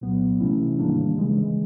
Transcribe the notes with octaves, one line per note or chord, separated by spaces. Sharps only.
C2 A#2 F#3 B3
C3 E3 A3 C#4 E4
G#2 D#3 G3 A#3 D4
C#3 E3 G#3